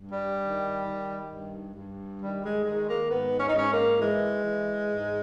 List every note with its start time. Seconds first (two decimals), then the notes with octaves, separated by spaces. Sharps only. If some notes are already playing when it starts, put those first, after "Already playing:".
Already playing: G2
0.09 G3
0.39 D#3
0.84 D#3
1.29 G2
1.75 G2
2.19 D#3 G3
2.42 G#3
2.64 D#3 G#3
2.87 A#3
3.09 G#2 B3
3.39 C#4
3.48 D#4
3.54 G#2 C#4
3.69 A#3
3.99 E3 G#3
4.45 E3
4.89 G#2